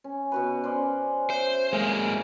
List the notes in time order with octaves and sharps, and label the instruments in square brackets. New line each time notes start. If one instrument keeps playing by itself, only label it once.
[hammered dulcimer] C#4
B2 F#4 B4
C#4 C5 D5
[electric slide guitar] C5 [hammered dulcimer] E5
[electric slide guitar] G#3 A#3 [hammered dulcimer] G#5